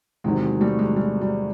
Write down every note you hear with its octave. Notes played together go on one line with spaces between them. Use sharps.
E2 C3 D#3 F#3 G#3
G#3
G3 A3
G#3
G3
G3